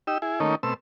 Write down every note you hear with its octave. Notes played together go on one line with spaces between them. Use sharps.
D#4 G4 E6
E4 G#4
D#3 A3 A#3 C#4 D#4
B2 A3 C4 E6